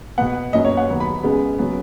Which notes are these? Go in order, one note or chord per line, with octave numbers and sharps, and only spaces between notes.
B2 B3 F#5
F#2 F#3 B3 D#5
C#5
F#5
D#2 D#3 F#3 B3
B5
C#2 C#3 G#3 B3
C#3 F#3 B3